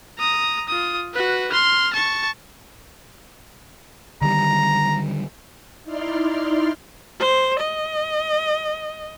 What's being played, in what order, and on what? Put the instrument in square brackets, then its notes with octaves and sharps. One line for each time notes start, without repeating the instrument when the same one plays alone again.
[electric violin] A#5 D#6
F4 D#6
F#4 B4
C6 F6
A5 C#6
[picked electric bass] D3 D#3 G3 [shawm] A#5
[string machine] D#4 E4 D5 C6 F6
[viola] C5
D#5